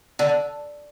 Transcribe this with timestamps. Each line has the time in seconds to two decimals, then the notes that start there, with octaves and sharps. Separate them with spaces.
0.19 D3